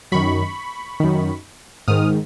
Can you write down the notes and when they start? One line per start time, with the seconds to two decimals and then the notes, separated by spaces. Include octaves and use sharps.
0.12 F#2 D#3 B5 C#6
1.00 F#2 D#3
1.88 G#2 D#3 D#6 F6